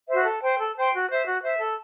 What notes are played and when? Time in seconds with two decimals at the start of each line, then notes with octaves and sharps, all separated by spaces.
0.09 F#4 C5 E5
0.25 A4
0.42 C5 G5 C6
0.58 A4
0.76 C5 G5 C6
0.92 F#4
1.08 C5 E5
1.25 F#4
1.43 C5 E5
1.58 A4